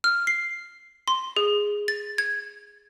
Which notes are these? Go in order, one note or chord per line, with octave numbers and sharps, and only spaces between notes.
F6
C7
C6
G#4
A6
G#6